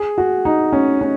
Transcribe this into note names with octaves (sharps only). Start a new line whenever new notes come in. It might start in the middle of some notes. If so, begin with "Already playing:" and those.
Already playing: G#4
F#4
D#4
C#4
C#4